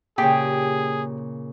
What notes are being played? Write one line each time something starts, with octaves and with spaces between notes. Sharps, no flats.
A#2 C#3 G4 G#4 G5